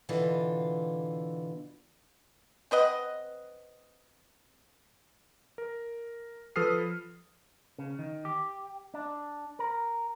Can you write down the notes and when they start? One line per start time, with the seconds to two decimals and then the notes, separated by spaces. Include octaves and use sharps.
0.09 B2 D3 E3 F4
2.71 C4 B4 D#5 F#5
5.58 A#4
6.56 F3 A4 B4 D#6 F6 C7
7.78 C#3
7.99 D#3
8.25 G4
8.94 D4
9.59 A#4